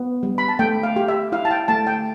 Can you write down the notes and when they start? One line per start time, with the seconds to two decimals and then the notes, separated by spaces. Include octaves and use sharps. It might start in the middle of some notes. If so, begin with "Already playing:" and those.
Already playing: B3
0.23 G3
0.38 B5
0.48 A5
0.59 A3 G5
0.83 F5
0.96 G4
1.08 E5
1.32 E4 F5
1.45 A5
1.51 G5
1.68 A3 A5
1.87 G5